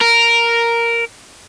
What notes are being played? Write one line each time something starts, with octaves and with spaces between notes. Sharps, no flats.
A#4